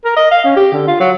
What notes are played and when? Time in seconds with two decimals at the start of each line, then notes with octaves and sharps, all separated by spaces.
0.05 A#4
0.17 D#5
0.31 F5
0.45 C#4
0.56 G4
0.73 D3
0.88 F4
1.00 F#3